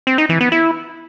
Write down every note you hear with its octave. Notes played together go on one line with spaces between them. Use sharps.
C4
D#4
E3
B3
E4